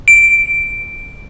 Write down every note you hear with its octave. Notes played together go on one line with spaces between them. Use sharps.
D7